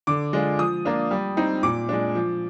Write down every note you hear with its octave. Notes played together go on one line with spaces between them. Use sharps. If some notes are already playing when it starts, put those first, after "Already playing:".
D3 D6
G#3 D4 F4
F3 D#6
A#3 D4 F4
G3
C4 D#4
A#2 D6
G#3 D4
F3